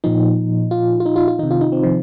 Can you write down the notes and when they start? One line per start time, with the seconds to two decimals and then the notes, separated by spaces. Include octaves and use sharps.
0.04 A#2 F3 D#4
0.71 F4
1.00 F4
1.06 D#4
1.16 F4
1.28 F4
1.39 D#3 D#4
1.43 C3
1.51 F4
1.61 D#4
1.72 C4
1.84 F3